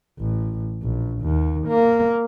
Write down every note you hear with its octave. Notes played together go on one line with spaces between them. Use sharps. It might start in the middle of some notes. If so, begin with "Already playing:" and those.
A1
A#1
D#2
A#3